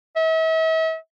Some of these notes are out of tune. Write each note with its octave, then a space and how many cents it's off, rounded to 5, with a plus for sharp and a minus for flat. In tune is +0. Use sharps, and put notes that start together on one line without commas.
E5 -40